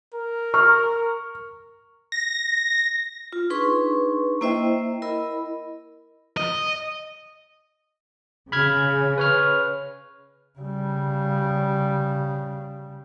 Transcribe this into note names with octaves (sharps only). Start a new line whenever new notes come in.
A#4
C#6 F6
A#6
F4
D4 D#4 G#4 B4 C6 C#6
A#3 E4 C5 D#5 E5 G5
E4 A#4 D#5 B5
D#5
C#3 B5 F6 G#6
B4 C#5 F6
C#3 G3